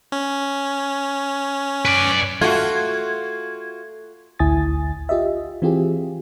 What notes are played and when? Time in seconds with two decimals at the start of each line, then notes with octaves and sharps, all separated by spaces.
0.12 C#4
1.85 B4 D5
2.41 A3 F4 F#4 G#6
4.39 A1 D2 E4 G#5 D#6 A6
5.09 F4 G4 D#5 E5
5.62 E3 C4 F4 G4 G#4